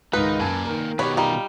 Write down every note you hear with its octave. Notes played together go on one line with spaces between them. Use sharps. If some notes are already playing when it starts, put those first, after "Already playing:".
C#2 G#2 D#3 D#4 B4
F#2 A#3 G#5 A5
D#3 A#4
B2 D#3 G4 B4 C#5
G3 D#4 F4